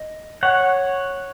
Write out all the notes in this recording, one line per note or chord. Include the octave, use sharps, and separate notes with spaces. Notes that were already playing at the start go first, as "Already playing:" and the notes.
Already playing: D#5
C#5 F#5